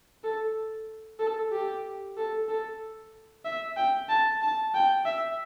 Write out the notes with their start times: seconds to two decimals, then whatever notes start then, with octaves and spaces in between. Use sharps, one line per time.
0.24 A4
1.19 A4
1.52 G4
2.17 A4
2.48 A4
3.45 E5
3.77 G5
4.09 A5
4.42 A5
4.74 G5
5.05 E5